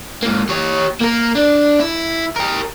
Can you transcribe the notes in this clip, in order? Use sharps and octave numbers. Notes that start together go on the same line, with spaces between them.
G#2 A#3
G4 C#5
A#3 A#4
D4
E4
G4 A#4